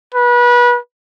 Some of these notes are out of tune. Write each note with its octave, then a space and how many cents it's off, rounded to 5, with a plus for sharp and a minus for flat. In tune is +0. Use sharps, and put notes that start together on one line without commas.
B4 -30